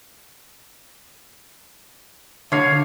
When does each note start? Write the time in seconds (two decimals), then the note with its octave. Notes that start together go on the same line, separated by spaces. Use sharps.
2.52 D3 C#5 F5